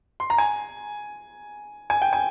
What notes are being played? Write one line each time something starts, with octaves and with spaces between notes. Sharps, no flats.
C6
A#5
G#5
G#5
G5
G#5